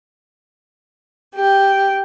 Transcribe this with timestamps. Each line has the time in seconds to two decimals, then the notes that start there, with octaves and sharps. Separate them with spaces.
1.35 G4